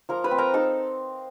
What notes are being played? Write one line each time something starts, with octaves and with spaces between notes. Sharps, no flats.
F3 A#4 A#5
B4 B5
C4
A#4 A#5
D#4 A4 A5